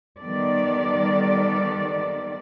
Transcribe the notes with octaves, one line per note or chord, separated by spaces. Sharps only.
D#3 G3 B3 A4 D5